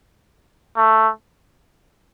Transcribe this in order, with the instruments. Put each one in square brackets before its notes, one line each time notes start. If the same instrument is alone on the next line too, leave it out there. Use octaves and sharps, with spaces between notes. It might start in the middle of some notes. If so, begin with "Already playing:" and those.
[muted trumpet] A3